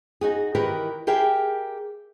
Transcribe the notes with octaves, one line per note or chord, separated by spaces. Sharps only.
D#4 F#4 G#4
D#3 E3 G4 A#4 B4
G4 G#4 A#4 E5 G5